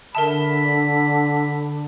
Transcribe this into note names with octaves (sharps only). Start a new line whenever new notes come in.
D3 A#4 E5 A5 B5